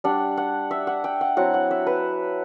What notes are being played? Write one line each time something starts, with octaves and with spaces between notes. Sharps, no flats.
G3 D4 F#5
F#5
E5
F#5
G5
F#5
F#3 C4 E4 F#5
F#5
E5
B4